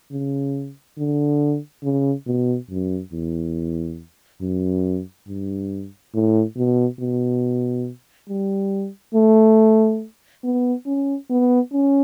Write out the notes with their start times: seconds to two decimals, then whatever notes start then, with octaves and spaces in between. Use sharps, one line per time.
0.12 C#3
0.98 D3
1.84 C#3
2.27 B2
2.70 F#2
3.13 E2
4.41 F#2
5.28 G2
6.14 A2
6.57 B2
7.00 B2
8.29 G3
9.15 A3
10.44 B3
10.86 C#4
11.30 B3
11.73 C#4